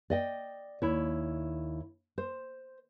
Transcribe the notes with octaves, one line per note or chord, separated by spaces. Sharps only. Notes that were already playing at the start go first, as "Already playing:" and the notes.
D5 D#5 G5
D#2 E4 C#5
C5